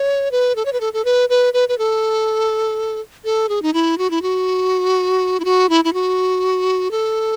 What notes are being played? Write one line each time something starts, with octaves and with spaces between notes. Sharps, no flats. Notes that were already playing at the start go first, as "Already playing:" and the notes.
Already playing: C#5
B4
A4
C#5
B4
A4
A4
B4
B4
B4
B4
A4
A4
G#4
D#4
E4
F#4
E4
F#4
E4
F#4
E4
E4
F#4
A4